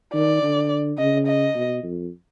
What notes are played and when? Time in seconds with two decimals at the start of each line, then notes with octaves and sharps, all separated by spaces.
0.13 D#3 D5
0.42 D3
0.98 C#3 D#5
1.27 D#5
1.54 B2
1.83 F2